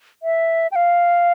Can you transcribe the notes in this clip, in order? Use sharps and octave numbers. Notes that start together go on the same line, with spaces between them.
E5
G5
F5